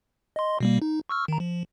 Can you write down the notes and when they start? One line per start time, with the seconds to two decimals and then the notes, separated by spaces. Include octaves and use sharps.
0.36 D#5 C6
0.60 B2 G3 A#3
0.82 D#4
1.09 C#6 E6 F6
1.28 D#3 A#5
1.40 F3